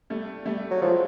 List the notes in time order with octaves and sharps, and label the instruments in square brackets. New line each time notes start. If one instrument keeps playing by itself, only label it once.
[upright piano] G3 A3
G3 A3
[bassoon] F#3
[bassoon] F3 [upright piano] F#3 G#3